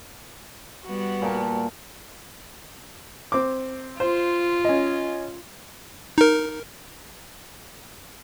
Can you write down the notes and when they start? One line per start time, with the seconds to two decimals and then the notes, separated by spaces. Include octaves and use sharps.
0.85 G3 B3 F#4
1.22 A#2 A#4 A5
3.32 C4 D6
4.00 F4 C5
4.65 C#4 D#5
6.18 D#4 A#4